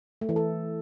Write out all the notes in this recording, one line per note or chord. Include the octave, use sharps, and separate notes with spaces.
A3
E3
A4